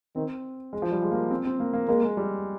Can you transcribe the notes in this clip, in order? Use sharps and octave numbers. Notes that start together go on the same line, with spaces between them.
D#3 C4
G#3
F3
G3
G#3
A#3
C4
C4
A#3
A#3
G#3 A#3
G#3
G3